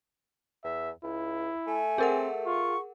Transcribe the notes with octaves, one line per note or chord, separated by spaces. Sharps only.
E2 E5
C#2 E4
A3 G#5
C4 G#4 A#4 F#5
F4 C#6